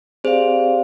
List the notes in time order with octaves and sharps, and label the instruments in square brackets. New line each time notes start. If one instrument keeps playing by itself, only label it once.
[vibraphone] C4 G4 D5 F5 [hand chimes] G#4 C5